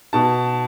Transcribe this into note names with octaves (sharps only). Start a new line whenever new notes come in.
B2 A5